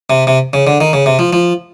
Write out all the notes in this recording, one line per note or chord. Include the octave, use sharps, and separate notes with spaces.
C3
C3
C#3
D3
D#3
C#3
C3
F3
F3